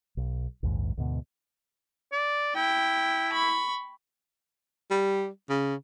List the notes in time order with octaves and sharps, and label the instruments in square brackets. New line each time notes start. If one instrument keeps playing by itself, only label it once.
[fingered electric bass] B1
A#1 D#2 G#2
D2 G#2 B2
[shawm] D5
[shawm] E4 [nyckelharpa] G5
[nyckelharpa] B5 C#6
[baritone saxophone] G3
C#3